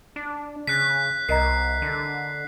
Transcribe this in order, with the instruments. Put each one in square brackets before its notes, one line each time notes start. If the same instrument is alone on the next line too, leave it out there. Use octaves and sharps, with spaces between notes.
[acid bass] D4
[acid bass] C#3 [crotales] F#6 B6
[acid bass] C2 [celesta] A#4 D#5 A#5 [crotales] C7
[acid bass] D3